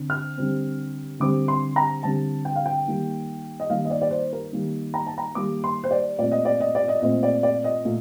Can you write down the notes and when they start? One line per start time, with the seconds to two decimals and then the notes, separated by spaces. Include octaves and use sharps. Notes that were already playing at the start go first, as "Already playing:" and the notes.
Already playing: D3 C4
0.10 F6
0.38 D3 G3 C4
1.20 D3 G3 C4 D6
1.48 C6
1.76 A#5
2.03 D3 G3 C4 A5
2.45 G5
2.56 F5
2.66 G5
2.87 D#3 G3 A#3
3.60 D#5
3.70 D#3 G3 A#3 F5
3.85 D#5
3.90 D5
4.02 D5
4.11 C5
4.33 A#4
4.53 D#3 G3 A#3
4.94 A#5
5.07 A5
5.18 A#5
5.35 D#3 G3 A#3 D6
5.64 C6
5.84 C5
5.91 D5
6.18 A#2 A3 C4 D5
6.32 D#5
6.45 D5
6.60 D#5
6.75 D5
6.88 D#5
7.02 A#2 A3 C4 D#5
7.23 D5
7.43 D5
7.64 D#5
7.85 A#2 A3